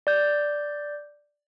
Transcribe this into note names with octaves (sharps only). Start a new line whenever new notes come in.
D5 G6